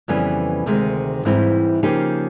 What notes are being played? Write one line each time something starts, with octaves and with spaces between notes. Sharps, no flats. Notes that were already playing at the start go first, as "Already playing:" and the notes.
F2 C#3 E3 G3 B3
D2 C3 D#3 G#3
G#2 E3 G3 C4 E4
C#3 F3 A#3 D#4 G4